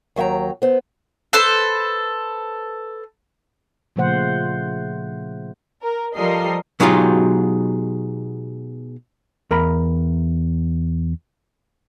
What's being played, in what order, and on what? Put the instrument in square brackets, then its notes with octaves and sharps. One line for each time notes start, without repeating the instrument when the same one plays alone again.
[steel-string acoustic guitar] D#2 F#3 E5 G5 A#5
B3 C5
[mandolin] A4 B4 C5
[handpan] A#2 C#3 F3 A3 C5 F#5
[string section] A#4
F3 G3 A4 A#4 D#5 C7
[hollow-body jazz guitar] B2 F#3 G#3 D#4 F4 G4
E2 A#4 A#5 B5